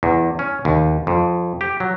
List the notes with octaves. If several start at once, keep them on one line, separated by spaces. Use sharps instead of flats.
E2
C#4
D#2
F2
G4
F#3